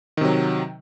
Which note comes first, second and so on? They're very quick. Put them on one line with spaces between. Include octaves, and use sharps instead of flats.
D#3 C3 F#3